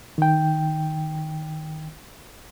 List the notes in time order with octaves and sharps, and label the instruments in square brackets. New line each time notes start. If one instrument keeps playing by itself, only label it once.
[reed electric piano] D#3 G5